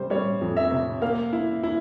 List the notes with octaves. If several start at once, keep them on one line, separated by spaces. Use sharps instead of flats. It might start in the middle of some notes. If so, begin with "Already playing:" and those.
Already playing: C3 G3 C5
G3 C#5
F2
E5
C3
A#3 F5
E4
E4